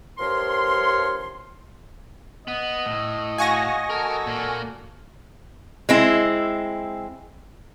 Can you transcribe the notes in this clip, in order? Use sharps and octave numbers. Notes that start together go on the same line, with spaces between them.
G2 F3 A#4 C#5 C6
B3 D#5
A2
F#4 F5 G#5 C#6 A#6
F#4 A4 A#4
A#2 A#3
G#3 C4 E4